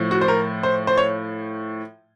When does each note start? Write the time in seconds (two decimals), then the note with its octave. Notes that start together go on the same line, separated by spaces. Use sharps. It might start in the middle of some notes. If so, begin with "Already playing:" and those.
Already playing: A2 F3
0.11 F#4
0.21 C5
0.28 A#4
0.63 C5
0.87 C5
0.98 C#5